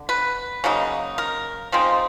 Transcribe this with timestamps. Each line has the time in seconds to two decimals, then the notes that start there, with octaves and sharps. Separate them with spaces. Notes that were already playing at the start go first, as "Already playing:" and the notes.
Already playing: D3
0.09 B4
0.64 C#3 F#3 A#3 D#4
1.18 A#4
1.72 F3 G#3 C4 D#4